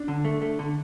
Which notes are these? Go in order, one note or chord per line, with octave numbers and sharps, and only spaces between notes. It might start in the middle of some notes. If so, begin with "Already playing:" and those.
Already playing: D4
D3
A3
A3
D3